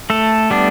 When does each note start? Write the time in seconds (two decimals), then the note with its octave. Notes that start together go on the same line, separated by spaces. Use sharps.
0.10 A3 A4
0.50 G3 B3 D4